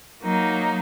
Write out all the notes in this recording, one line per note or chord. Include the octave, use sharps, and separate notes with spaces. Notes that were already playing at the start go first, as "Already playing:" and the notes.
F#3 A#3 D#4